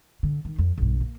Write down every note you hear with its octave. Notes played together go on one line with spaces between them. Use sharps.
D3
D#3
F2
B1 G2
A#3